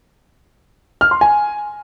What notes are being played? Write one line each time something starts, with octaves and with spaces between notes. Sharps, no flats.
F6
C6
G#5